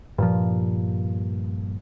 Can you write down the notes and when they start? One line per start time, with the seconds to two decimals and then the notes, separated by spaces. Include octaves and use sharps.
0.18 G2 A#2 F3